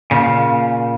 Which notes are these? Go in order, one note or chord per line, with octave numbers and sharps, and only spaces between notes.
A#2 C#3